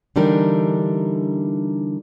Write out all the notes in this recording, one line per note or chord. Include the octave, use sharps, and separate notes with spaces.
D3 E3 G3 D4 D#4 A#4